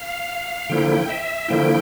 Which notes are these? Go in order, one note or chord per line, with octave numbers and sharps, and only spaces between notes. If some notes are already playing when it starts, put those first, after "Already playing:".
Already playing: F5
D3 F3 A#3 E4 G5
E5
D3 F3 A#3 E4 G5